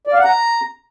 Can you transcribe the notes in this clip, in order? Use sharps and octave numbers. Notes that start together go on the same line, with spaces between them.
D5
F5
F#5
A#5